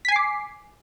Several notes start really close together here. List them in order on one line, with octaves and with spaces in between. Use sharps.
B6 G#5 C7 D6